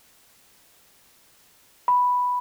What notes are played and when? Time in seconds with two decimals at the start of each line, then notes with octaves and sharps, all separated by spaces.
1.88 B5